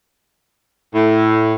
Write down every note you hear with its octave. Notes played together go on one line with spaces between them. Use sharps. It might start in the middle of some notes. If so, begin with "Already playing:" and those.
A2